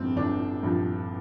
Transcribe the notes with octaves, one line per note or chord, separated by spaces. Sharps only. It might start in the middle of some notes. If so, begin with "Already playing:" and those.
Already playing: G1 G2 F3 C4
G1 D4
G2 F3